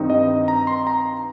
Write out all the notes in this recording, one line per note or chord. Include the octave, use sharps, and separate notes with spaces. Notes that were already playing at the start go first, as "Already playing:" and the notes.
Already playing: G2 D#3 C4 D#4
D#5
A#5
C6
A#5